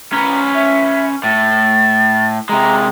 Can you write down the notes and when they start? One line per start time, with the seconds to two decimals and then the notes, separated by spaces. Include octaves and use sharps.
0.13 C#4 B4 A#5
0.54 E5
1.24 A2 A6
2.49 C3 G#3 A#5